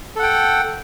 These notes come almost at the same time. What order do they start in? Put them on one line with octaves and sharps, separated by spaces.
A4 F#5 G5